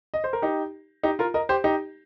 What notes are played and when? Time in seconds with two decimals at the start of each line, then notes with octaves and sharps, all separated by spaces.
0.14 D#5
0.24 C5
0.33 A#4
0.42 D#4 G4
1.03 D#4 G4
1.19 F4 A#4
1.34 A#4 D#5
1.49 G4 C5
1.64 D#4 G4